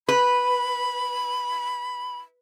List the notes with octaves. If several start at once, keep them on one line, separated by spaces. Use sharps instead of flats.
B4 B5